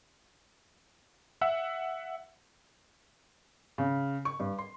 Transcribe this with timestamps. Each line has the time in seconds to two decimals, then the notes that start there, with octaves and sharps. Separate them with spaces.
1.41 E5 F#5 E6
3.78 C#3
4.25 C#6
4.40 G2
4.59 C6